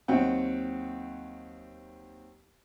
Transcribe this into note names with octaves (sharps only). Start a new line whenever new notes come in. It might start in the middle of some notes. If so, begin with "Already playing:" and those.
D#2 F#3 C4 F#5 G5